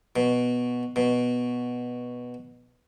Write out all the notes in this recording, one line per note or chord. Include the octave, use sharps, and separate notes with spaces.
B2
B2